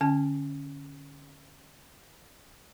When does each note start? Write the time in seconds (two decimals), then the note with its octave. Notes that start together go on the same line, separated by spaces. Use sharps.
0.01 D3 C#4 A5